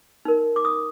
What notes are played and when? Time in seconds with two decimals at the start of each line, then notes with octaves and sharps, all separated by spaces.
0.25 D#4 A#4
0.56 D6
0.65 D#6